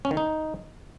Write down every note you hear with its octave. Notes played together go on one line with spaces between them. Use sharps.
C#4
D#3
D#4